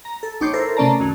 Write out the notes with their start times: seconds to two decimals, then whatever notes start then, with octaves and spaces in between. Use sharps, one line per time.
0.05 A#5
0.23 A4
0.41 A1 D#4 C#5 D6 G6 C7
0.53 E4 A4 A#4 C5
0.77 C3 A3 C#4 D5 A5 A#5
0.99 C#2 F#2 D#3